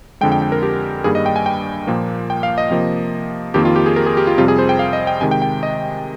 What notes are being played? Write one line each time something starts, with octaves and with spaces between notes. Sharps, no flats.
F2 D3 G#3 G5
G5
G5
A#4
G4
G2 D#3 G3 A#3 G#4
D#5
G5
G#5
G5
A#2 F3 A#3
G5
F5
D#5
C3 F3 A#3
F2 D#3 A#3 G4
F4
G4
G#4
A#4
G#4
G4
F4
F2 C3 G3 F4
G#4
C5
G5
F5
D#5
G5
C3 D#3 G#3 G#5
G5
G5
D#5